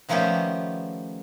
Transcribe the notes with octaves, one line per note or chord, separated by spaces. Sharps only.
D#3 F3 A3 B3 C#4 G4